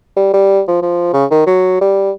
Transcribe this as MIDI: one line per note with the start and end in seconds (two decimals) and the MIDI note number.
0.17 0.30 55
0.34 0.61 55
0.68 0.78 53
0.83 1.13 53
1.14 1.26 49
1.31 1.42 51
1.47 1.76 54
1.81 2.11 55